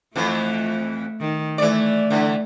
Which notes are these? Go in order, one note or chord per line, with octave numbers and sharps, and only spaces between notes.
F2 E3 A3
D#3
E3 A3 D5
D3 E3